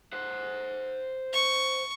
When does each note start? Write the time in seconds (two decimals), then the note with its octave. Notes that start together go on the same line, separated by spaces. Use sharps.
0.13 C5 F#5
1.33 C#6